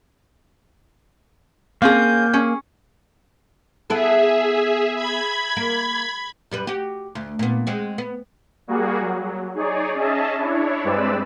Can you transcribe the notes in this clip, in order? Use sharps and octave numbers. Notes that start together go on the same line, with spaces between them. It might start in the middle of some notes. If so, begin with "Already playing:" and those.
A#3 C4 C#4 G#4 F5 G6
C#4 G#4
B3 E4 G#4 A4 E5
B5 G#6
A#3
F#2 G3 B4
F#4 G4
D2
A#2 B3
G#3 C4 F#4
B3
G3 A#3 F#4 G#4
F#3
D#4 G#4 C#5 D5
C#4 G#4 D#5 E5 A5
D4 E4 C#5
G2 G#3 C4 B4 D5 E6